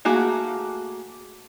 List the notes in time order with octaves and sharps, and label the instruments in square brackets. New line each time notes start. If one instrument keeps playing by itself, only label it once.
[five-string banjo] A3 A#3 F#4 G#4